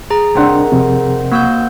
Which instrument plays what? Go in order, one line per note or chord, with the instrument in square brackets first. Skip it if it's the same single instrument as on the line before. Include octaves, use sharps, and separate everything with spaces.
[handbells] G#4 A#5
[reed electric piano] C2 D4 [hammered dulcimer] D#3 C4 F#5
[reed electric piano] F2 C3
[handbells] A#3 E6 G6 [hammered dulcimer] F#4